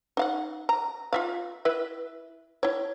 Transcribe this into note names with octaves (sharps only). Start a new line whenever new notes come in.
D#4 F5 F#5
A#5
F4 E5 F5
E4 B4 E5
E4 C#5